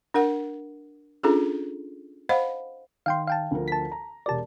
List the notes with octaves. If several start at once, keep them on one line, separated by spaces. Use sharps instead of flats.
D4 A#4 F#5
C#4 D4 F4 G#4 A4
C5 D#5 F5 F#5 B5
D#3 F5 G5 C6
F5 G5 A5
D2 F3 A#4
A5 B6
A#5
E1 G4 A#4 D5 A5